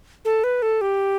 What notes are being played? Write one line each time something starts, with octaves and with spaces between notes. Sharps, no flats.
A4
B4
A4
G4